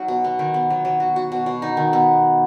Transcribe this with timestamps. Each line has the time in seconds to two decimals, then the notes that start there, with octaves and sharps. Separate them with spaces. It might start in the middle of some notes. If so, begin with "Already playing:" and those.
Already playing: F#3 C#4 D#4 F#4
0.08 B2
0.24 B3
0.39 D#3
0.54 B3
0.70 F#3
0.85 F#3
1.00 F#4
1.16 F#4
1.32 B2
1.46 B2
1.62 D#4
1.77 D#3
1.93 B3